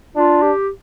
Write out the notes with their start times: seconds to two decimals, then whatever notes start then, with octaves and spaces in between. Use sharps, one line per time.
0.16 D4 F4
0.42 G4